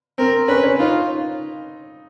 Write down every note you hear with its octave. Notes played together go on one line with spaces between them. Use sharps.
C4 A#4
C#4 B4
C#4
D#4 F4